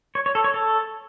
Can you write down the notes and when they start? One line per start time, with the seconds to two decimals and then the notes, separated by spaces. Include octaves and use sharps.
0.15 C#5
0.26 C#5
0.35 A4
0.44 C#5
0.54 A4